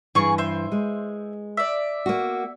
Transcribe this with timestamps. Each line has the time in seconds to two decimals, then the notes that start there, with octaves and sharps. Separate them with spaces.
0.15 G2 E3 G#4 C#6
0.38 C5 E5 C6
0.72 G#3
1.57 D5 E5
2.06 A#3 F#4